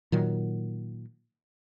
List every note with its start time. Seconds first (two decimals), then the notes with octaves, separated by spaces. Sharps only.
0.12 A#2 D#3 F#3